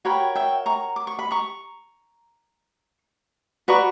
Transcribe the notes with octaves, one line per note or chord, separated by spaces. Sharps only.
F#4 A#4 C#5 G5 B5
E5 G5
A#5 C#6
D6
C#6
B5
A#5 C#6
F#4 B4 D5 A#5 C#6